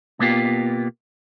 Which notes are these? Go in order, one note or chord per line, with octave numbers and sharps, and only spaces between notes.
B2 A#3 B3 F4 G4